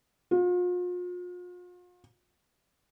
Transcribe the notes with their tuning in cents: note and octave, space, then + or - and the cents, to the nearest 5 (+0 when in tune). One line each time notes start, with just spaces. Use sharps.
F4 +40